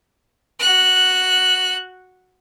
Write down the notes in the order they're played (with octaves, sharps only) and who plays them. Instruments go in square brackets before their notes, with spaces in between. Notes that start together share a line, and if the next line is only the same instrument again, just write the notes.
[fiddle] F#4 F#6